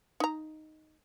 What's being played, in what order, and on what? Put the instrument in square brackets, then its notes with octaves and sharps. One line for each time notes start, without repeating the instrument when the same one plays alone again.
[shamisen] D#4 A#5